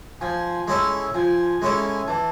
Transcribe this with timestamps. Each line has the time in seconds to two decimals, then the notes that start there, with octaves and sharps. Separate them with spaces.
0.21 F3 G#5
0.68 G#3 C#4 E4 A4
1.14 F3 G#5
1.62 G#3 C#4 E4 A4
2.08 E3 A5